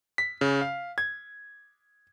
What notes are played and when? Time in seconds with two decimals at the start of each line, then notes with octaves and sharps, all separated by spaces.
0.18 B6
0.41 C#3
0.61 F5
0.98 G#6